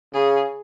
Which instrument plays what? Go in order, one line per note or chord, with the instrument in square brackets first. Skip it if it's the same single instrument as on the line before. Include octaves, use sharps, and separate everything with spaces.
[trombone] C#3 [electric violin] G#4